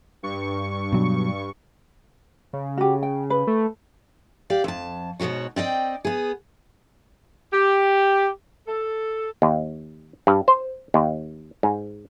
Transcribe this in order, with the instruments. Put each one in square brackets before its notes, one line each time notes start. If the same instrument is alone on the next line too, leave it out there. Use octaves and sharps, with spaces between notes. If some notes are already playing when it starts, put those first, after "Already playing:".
[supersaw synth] G2 C#6
[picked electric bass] B2 F#3
[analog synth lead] C#3
[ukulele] F#4 G4
G5
B4
[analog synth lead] A3
[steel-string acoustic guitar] G4 D5 F5
F2 A5
G#2 B2 D#3 F#4 C#5
C4 D5 D#5 G5
B3 G#4
[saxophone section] G4
A4
[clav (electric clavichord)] D#2
G2
C5
D#2
G#2